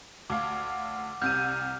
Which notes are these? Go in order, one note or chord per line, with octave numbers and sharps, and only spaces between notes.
D2 F5 D6
C2 C3 F6 G6 D#7